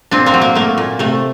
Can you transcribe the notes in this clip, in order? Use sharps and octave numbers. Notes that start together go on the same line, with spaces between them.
A#2 C4 D4
A#3 C4
F#3
A#3
A3 A#3
A#2
C3 A3